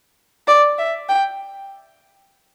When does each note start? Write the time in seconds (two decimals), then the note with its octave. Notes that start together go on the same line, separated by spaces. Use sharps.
0.48 D5
0.79 E5
1.09 G5